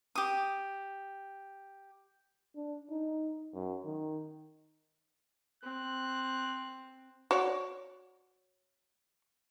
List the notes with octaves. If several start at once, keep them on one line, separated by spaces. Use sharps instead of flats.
G4 D#6
D4
D#4
F#2
D#3
C4 F#6
F#4 C#5 D5